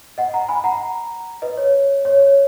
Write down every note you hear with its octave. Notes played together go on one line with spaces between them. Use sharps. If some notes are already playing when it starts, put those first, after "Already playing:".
D#5 F#5
F#5 A#5
G#5 B5
F#5 A#5
B4 D#5
C#5
C#5
C#5